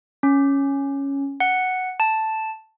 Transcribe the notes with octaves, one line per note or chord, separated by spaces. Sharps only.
C#4
F#5
A5